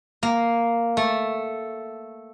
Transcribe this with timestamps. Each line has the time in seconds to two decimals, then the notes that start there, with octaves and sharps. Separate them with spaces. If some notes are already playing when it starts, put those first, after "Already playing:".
0.23 A#3
0.97 A3